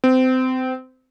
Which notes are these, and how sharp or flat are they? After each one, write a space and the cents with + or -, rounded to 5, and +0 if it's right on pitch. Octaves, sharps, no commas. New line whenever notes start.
C4 -25